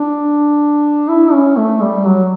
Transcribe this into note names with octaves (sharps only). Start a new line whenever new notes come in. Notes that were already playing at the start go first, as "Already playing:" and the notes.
Already playing: D4
E4
C#4
A3
G3
F#3